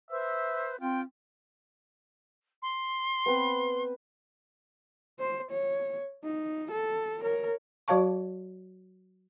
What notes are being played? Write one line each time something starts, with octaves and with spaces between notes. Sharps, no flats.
B4 C5 E5
C4 F4 G5
C6
B3 C4 B4
C5
C#5
D#4
A4
A#4 C#5
F#3 F#4 C#5 F5 A5 C#6